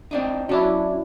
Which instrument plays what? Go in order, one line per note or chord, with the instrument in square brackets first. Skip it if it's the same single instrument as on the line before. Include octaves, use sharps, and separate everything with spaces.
[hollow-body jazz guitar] C4 D4 D#4
[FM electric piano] F#3 D4 E4 [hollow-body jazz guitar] C#4 D5